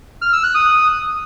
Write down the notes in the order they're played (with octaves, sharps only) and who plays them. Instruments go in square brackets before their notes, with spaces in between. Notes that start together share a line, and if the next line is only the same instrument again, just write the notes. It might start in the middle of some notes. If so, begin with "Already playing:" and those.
[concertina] F6
E6
F#6
D#6